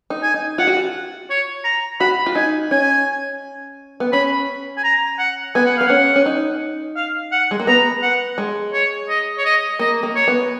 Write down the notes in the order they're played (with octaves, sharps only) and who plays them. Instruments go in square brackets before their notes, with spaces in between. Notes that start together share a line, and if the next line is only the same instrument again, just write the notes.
[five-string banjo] D#4
[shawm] G#5
[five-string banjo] D#4
[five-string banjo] F4 [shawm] F#5
[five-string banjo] F#4
F4
[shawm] C#5
A#5
[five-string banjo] F#4 [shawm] B5
[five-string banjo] F4
[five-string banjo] D#4 [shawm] G#5
[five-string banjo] C#4 [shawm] G#5
[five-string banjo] B3
[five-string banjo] C#4 [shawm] B5
[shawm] G#5
A#5
F#5
[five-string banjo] B3 [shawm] G#5
[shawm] F#5
[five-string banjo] B3 [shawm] F5
[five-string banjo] C#4 [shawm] F#5
[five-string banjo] C#4
D#4
[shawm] F5
F#5
[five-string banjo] G#3
A#3
[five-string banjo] B3 [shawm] A#5
[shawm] F#5
[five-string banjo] G#3
[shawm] C#5
D#5
C#5
D#5
[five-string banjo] A#3 [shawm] D#5
[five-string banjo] A#3
[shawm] C#5
[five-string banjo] B3